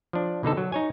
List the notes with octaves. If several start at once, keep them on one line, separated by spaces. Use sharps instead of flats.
F3 D4
B2 D3 D#4 A4
F#3
D#4 C#5 G#5